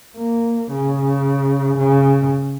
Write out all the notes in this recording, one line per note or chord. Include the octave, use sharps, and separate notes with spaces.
A#3
C#3
C#3